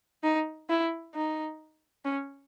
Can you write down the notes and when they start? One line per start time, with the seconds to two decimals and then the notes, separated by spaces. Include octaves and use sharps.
0.24 D#4
0.70 E4
1.15 D#4
2.05 C#4